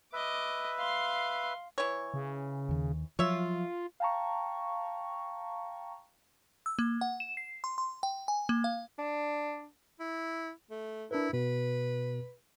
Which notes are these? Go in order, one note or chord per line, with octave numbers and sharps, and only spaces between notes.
B4 D#5 E5 D6
F5 C6
E3 C#5
C#3
D#2 D#3
F3 F#3 F4 C#5 E5
F5 G5 A5 A#5 C#6
E6
A#3
F#5
E7
C7
C6
C6
G5
G#5
A#3
F5
D4
E4
A3
D4 E4 A#4 B4
B2 B4